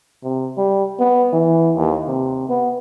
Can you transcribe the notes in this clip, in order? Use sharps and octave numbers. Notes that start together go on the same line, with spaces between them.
C3
G3
B3
E3
D#2
C3
B3